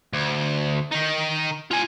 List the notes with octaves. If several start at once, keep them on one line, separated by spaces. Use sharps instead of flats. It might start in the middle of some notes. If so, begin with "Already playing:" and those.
D2
D#3 D#4
F4 G#5